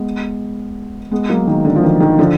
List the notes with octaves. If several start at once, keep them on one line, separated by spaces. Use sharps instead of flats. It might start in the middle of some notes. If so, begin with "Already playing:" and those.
Already playing: G#3 B3
G#3 B3
F#3 A#3
D#3
D3
F3
D#3
D#3
D3 F3